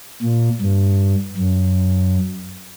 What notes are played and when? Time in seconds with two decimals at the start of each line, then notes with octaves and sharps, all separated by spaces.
0.23 A#2
0.61 G2
1.38 F#2